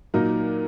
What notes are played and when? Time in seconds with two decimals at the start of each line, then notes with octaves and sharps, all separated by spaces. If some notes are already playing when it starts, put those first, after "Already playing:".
0.14 A#2 F#3 A#3 D#4 A#4